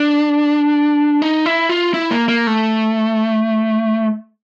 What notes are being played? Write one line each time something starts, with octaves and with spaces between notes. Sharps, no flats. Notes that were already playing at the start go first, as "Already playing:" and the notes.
Already playing: D4
D#4
E4
F4
E4
A#3
A#3
A3